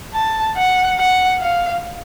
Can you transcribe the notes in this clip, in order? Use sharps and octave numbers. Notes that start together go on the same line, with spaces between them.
A5
F#5
F#5
F5